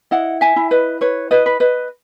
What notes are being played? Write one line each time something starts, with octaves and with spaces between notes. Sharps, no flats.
E4 D#5 F#5
E5 G#5
E4
B4 D#5
B4 C#5
B4 D#5
B4
B4 D#5